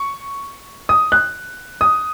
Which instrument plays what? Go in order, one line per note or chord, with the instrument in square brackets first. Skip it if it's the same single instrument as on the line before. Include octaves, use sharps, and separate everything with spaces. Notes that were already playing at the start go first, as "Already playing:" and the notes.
Already playing: [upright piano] C#6
D#6
F#6
D#6